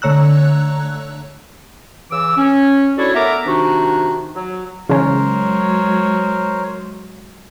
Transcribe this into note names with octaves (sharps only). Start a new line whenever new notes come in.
D3 A3 C#5 A#5 E6 F#6
C#3 E3 D6 E6
C#4
D4 E4 F#4 A4 C#5 D5
A3 B3 A#4 E5 A#5 D6
C3 D#3 D4 D#4 F#4
F#3
C#3 E3 F#3 G#3 C#4 A#4 C5 C#5